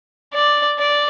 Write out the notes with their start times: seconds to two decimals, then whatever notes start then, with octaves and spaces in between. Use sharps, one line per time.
0.34 D5
0.79 D5